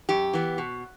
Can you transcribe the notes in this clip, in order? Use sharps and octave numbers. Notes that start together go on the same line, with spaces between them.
F#2 G4
E3 B3
B2